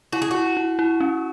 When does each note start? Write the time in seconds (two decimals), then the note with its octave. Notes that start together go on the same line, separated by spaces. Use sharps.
0.12 E4 F#4
0.22 G#4
0.31 E4 F#4
0.57 E4
0.79 E4
1.00 C#4